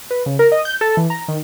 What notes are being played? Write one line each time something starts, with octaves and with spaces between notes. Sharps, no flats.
B4
C#3
A#4
D#5
G6
A4
E3
A#5
D#3